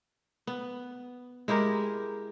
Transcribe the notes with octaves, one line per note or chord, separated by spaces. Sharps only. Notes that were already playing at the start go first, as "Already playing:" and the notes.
B3
G#3 E4 G4 A#4